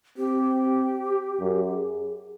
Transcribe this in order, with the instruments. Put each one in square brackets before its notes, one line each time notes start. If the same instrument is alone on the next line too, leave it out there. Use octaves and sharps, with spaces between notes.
[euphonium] C4 [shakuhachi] G4
[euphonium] F#2
G#4